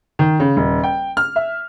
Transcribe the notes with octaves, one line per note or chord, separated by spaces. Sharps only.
D#3
C#3
D#1
G5
F6
E5